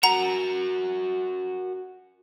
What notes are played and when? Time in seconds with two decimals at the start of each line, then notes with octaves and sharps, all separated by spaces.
0.03 F#4 A#4 F#5 A#5